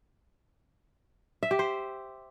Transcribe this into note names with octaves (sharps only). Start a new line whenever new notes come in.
E5
G4
C5